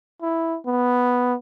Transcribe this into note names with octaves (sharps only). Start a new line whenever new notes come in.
E4
B3